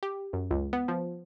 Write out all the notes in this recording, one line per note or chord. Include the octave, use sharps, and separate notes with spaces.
G4
F#2
C#2
B3
F3